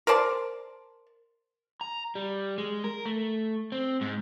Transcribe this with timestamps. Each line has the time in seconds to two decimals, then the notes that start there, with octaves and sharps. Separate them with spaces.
0.07 A#4 C5 D5 A5
1.81 A#5
2.15 G3
2.58 G#3
2.84 A#4
3.05 A3
3.72 C4
4.01 G#2